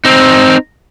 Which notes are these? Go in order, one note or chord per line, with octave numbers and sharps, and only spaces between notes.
C4 D#4